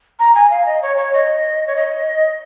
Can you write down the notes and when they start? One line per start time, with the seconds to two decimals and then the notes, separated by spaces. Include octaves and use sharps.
0.19 A#5
0.35 G#5
0.50 F5
0.66 D#5
0.82 C#5
0.97 C#5
1.13 D#5
1.67 C#5
1.76 D#5